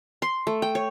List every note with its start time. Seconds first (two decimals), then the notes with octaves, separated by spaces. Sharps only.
0.22 C6
0.47 A3
0.62 G5
0.75 C#5